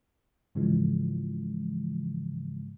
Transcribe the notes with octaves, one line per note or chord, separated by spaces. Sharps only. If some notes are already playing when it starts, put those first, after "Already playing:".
G#2 C#3 E3 F3 G#3